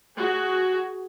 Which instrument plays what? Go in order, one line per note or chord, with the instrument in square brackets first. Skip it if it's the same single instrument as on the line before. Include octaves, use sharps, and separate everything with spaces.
[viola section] F#4 G#4